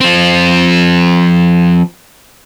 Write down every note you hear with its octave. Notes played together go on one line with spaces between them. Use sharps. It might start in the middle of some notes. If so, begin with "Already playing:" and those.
F3 C4